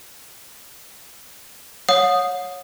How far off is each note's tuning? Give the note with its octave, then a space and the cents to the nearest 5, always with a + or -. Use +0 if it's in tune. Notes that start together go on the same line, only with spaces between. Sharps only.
C#5 +0 F#5 -40 D#6 -5